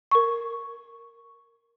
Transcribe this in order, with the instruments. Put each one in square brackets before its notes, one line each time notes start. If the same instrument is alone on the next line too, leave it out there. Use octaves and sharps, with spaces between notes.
[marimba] A#4 C#6